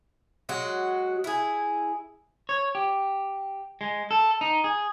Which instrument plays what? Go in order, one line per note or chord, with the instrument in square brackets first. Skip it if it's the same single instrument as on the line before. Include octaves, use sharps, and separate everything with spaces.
[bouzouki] F#3 G#3 F#4
E4 G#4
[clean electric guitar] C#5
G4
G#3
A4
D#4
G#4